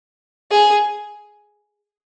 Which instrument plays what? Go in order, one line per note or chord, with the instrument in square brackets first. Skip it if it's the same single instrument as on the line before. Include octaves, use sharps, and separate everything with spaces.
[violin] G#4